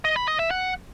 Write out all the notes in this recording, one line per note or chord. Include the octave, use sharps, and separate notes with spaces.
D#5
B5
D#5
E5
F#5